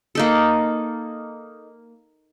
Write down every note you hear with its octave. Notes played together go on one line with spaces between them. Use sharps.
A#3 D#4 A4